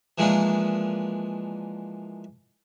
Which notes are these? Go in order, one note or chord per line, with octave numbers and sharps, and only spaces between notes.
E3 F3 G#3 A#3 D4 D#4